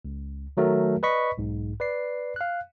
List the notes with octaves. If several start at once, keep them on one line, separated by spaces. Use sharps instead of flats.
C#2
D#3 F#3 A3 F#4 A#4
B4 D5 D#5 B5 C#6 B6
B1 G#2
B4 D5 C7
F5 F#6